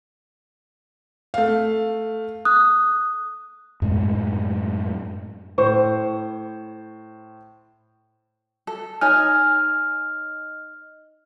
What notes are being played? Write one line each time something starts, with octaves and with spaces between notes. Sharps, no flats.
A3 F5
D#6 F#6
F#2 A2 G#3
A2 C5 C#6
A4
D#4 C#5 G#5 F6